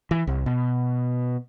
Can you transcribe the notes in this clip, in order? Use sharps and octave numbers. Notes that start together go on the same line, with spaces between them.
E3
C2
B2